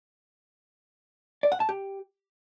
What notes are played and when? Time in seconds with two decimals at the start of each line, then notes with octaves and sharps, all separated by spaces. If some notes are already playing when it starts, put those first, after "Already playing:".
1.43 D5
1.52 F#5
1.60 A5
1.69 G4